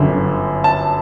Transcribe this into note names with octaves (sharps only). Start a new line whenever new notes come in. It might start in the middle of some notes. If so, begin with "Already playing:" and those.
Already playing: G1 F#2 D3
A5